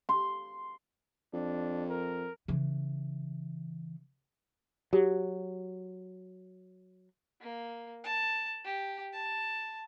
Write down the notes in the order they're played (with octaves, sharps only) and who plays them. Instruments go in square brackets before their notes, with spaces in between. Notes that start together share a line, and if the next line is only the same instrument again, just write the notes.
[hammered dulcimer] C6
[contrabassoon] F2 [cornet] D4
[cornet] A#4
[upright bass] C#3 E3
[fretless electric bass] F#3 [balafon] F#4 G4
[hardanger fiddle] A#3
A5
G4
A5